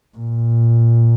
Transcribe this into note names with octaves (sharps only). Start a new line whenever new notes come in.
A#2